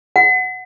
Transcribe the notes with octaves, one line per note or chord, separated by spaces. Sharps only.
F#5